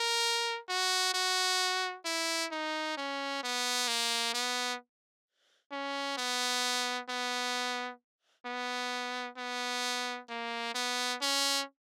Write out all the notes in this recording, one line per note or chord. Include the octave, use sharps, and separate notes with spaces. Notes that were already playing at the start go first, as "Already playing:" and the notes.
Already playing: A#4
F#4
F#4
E4
D#4
C#4
B3
A#3
B3
C#4
B3
B3
B3
B3
A#3
B3
C#4